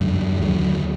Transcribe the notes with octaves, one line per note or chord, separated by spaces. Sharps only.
F#2 D3
D#2 D3 D#3 F#3